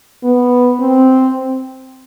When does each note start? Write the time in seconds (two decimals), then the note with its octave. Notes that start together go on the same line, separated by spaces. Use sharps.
0.24 B3
0.80 C4